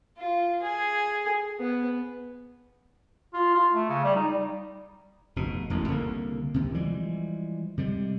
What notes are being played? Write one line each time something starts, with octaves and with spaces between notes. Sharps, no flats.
F4
G#4
B3
F4
F4
A3
C#3
G3
D#4
G3
F1 B2
E1 A1 E2
C2 D3 G#3 A#3
D#2 C3
E3 F3 G3 G#3
C3 G3 G#3